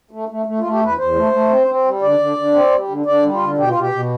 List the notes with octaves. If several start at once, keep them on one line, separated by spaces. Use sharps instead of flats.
A3
A3
A3
F4
A3
G4
E2 B4
E2 C5
A3
A3
C4
C4
G3
D3 D5
D3
D3
C4
G3
D3
D3 D5
G3
F4
D3
B2 G4
F4
B2 G4
B2